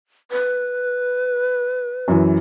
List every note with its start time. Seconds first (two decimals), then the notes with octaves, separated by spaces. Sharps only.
0.31 B4
2.08 F#2 E3